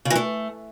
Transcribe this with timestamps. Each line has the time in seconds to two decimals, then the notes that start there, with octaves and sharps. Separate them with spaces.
0.05 C#3
0.10 E3
0.15 A3